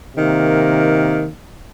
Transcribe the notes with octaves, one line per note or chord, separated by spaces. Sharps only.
C3 D#3 A#3